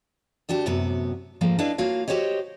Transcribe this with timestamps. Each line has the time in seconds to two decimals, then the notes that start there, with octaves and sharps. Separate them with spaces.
0.49 D2 D4 F#4 G4
0.66 F#2 A2 C3 B3 F#4
1.41 G#2 F3 A3 A#3
1.59 D4 E4 B4 D#5 F5
1.78 A#3 F4 F#4 C#5 F5
2.08 F#4 G4 C5 C#5 D#5